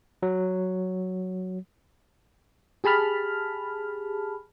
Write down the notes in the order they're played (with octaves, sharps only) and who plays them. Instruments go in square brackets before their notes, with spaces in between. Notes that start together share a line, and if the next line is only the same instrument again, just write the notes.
[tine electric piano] F#3
[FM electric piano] G4 G#4 A5 B5 F6